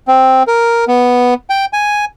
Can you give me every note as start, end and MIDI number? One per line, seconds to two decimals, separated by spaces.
0.08 0.43 60
0.47 0.85 70
0.88 1.34 59
1.50 1.65 79
1.73 2.05 80